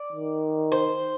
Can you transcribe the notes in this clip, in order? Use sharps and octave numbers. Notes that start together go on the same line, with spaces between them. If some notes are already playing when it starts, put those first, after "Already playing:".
Already playing: D5
D#3
C5